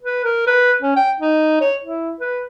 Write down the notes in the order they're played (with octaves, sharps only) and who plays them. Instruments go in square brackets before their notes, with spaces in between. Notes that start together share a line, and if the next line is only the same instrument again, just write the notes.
[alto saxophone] B4
A#4
B4
C#4
G5
D#4
C#5
E4
B4